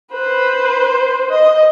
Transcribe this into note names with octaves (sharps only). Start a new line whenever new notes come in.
B4 C5
D#5